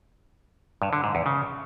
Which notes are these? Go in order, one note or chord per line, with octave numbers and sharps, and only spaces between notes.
G2
D3
G#2
E2
C#3